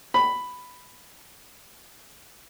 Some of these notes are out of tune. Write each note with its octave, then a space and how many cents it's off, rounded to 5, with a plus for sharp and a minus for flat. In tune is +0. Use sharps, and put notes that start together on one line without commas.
B5 +5